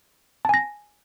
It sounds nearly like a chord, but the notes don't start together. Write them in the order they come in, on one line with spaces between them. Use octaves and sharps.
A5 G#5 A#6